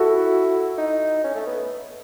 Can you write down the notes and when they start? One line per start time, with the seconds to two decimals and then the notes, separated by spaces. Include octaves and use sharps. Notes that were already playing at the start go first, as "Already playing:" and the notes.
Already playing: E4 F#4 A4
0.78 D#4
1.24 C#4
1.35 A3
1.46 B3